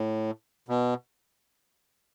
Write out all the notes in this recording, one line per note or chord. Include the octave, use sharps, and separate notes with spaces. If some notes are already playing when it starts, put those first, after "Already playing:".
Already playing: A2
B2